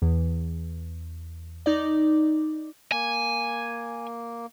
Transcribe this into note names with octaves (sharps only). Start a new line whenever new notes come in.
E2
D#4 D5
A#3 G#5